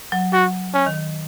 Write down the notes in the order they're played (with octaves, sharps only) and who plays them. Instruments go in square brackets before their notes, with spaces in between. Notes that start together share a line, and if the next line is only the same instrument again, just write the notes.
[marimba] F#3
[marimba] F#3 [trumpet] F#4
[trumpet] C#4
[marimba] D#3